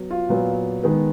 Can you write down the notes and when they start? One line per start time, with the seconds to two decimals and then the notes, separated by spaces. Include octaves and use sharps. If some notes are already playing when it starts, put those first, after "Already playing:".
Already playing: F#3 B3
0.11 F4
0.29 A#2 F#3 B3
0.83 D#3 G#3 B3